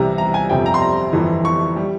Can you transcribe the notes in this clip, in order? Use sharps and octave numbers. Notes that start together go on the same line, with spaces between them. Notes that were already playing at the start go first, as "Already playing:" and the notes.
Already playing: C2 C3 E3 G3 A#5
A#5
G#5
G1 F2 C3 G5
A#5
C6
A#5
G1 F2 E3
C#6
G3